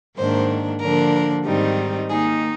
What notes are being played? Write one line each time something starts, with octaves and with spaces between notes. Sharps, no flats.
G#2 D#3 A#3 D4 C5
D3 F3 A#3 D4 A#4
G#2 D#3 G3 C4 D#4
D#3 A#3 D#4 G#4